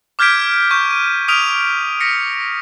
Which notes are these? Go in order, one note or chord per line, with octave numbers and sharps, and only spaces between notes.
D6 F6 G6 G#6 B6 D7
C#6 G6
D#7
D#6 F6 B6 D7 D#7 F7
A#6 B6 C#7